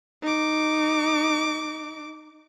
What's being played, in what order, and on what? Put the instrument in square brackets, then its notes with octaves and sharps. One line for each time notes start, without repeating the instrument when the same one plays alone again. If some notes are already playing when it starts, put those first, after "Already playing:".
[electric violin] D#4 D6